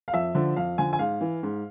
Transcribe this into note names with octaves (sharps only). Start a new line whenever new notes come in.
F5
F2 E5
D3 F3
F2 F5
D3 F3 G#5
G#5
G#2 F5
E3
G#2